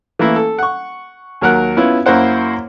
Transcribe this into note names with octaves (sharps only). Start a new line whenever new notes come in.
E3 A3 A#3 E4
A4
F#5 C#6
D#2 F#3 A#4 F#5 F#6
B3 C#4 E4 F4
F#2 A#3 E4 C5 F#5